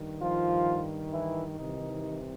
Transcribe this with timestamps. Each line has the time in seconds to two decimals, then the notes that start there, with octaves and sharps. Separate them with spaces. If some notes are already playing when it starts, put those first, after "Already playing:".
Already playing: G2 D#3
0.21 F3 F4
1.13 E3 E4
1.58 C2 C3 D#3 E3 D#4